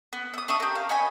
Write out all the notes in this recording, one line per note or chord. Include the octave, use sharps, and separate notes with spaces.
B3
E5 D#6
D4 E5 C#6 D#6
G4 A#4
F5
C#5 D#5 G#5 B5